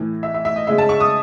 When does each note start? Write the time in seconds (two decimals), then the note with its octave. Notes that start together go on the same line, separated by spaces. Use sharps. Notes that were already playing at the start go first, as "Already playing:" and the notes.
Already playing: A2 E3 A3
0.23 E5
0.34 E5
0.45 E5
0.56 D#5
0.67 C#3 G#3 E5
0.78 A5
0.89 C#6
1.00 D#6